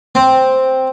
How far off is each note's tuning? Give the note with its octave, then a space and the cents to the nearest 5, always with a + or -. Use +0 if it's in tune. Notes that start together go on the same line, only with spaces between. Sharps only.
C4 +0